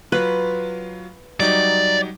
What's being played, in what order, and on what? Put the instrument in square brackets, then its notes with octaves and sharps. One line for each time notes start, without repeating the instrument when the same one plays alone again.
[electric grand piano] F#3 F4 F5 [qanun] B4
[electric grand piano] F#3 G3 D#4 [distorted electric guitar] D5